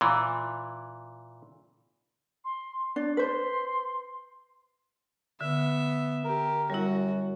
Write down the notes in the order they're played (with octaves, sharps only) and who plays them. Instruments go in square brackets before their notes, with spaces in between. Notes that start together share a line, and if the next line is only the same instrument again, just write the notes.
[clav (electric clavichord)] A#2 E3
[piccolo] C6
[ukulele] D4 [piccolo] A6
[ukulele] B4 C5 [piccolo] C6
[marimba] D3 [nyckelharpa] B3 E5
[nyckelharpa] G4 [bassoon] A#4
[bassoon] F#2 [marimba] G3 E4 [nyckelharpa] F#4